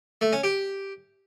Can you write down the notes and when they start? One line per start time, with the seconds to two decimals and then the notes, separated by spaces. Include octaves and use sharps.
0.21 A3
0.32 C#4
0.44 G4